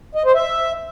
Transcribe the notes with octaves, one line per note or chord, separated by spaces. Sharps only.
D#5
C5
E5